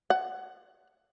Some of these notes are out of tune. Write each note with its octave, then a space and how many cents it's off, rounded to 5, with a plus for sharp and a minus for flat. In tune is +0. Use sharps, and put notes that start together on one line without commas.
F#5 +15